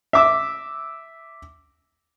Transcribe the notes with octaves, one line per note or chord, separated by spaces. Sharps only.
E5 D6 E6